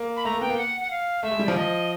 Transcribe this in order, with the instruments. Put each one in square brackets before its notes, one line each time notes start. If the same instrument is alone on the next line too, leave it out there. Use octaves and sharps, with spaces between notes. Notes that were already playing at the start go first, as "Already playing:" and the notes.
Already playing: [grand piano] A#3
[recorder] B5
[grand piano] A3 [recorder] A#5
[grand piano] A#3
[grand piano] B3 [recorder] G5
[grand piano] A#3
[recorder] F#5
F#5
F5
[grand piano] A3 [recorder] E5
[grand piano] G#3
G3
[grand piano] F3 [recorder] D5
[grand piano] F3 [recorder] D#5